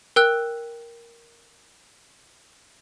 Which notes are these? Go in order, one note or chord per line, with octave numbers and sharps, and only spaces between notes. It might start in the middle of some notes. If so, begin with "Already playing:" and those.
A#4 G5 E6 F#6